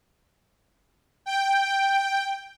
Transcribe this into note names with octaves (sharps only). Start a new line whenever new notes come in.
G5